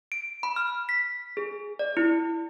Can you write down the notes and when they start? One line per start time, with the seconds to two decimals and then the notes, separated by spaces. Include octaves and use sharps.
0.12 D7
0.43 B5
0.56 F6
0.89 B6
1.37 G#4
1.79 D5
1.97 E4